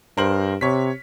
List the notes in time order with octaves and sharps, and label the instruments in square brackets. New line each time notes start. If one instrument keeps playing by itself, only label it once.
[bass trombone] G2 [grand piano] A#4 C5 F#7
[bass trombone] C3 [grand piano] C#5 B6